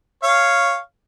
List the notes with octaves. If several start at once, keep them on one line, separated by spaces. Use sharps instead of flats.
C#5 F5